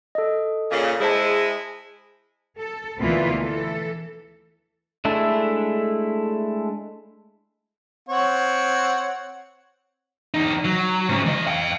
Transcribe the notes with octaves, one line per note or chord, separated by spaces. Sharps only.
A4 D#5
A#2 C#3
G#3 E4 G#4 C5 A5
A4
D2 B2 E3 A#3 F4 B4
E3 A4
G#3 A3 D4 E4 A4
C4 C#5 F#5
E2 D#4
F#3
G#2 C#3
E3 D#5
F5 G5